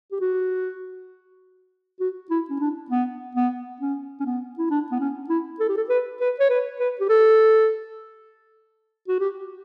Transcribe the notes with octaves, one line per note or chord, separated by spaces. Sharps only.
G4
F#4
F#4
E4
C#4
D4
B3
B3
C#4
C#4
B3
E4
D4
B3
C#4
E4
A4
G4
A4
B4
B4
C#5
B4
B4
G4
A4
F#4
G4